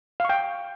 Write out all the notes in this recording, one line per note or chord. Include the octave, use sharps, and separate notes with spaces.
F5 G5 C#6